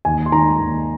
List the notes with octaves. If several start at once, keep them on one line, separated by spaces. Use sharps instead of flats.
D#2 G#5
C6
D#3 A#5
D#2